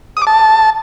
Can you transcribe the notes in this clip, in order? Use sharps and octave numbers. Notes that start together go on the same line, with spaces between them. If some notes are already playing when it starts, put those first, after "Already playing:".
D#6
D6
A5